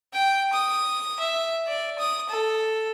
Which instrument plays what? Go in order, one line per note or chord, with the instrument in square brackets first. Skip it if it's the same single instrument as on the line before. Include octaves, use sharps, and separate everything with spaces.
[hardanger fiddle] G5
D#6
E5
D5
D#6
A4